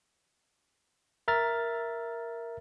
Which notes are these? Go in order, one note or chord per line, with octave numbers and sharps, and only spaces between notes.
A#4 E5 A#5 F6 A6